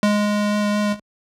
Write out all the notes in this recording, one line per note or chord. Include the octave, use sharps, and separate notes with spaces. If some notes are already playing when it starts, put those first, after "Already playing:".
G#3